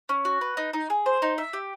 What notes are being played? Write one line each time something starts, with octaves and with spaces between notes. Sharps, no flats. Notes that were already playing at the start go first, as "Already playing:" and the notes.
C#4
F#4
B4
D#4
D#4
G#4
C5
D#4
E5
G4